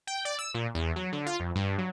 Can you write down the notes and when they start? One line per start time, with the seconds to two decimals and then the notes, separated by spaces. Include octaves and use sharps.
0.07 G5
0.25 D5
0.39 E6
0.54 A#2
0.75 E2
0.96 F#3
1.13 D3
1.26 F4
1.40 F2
1.56 G2
1.78 F#3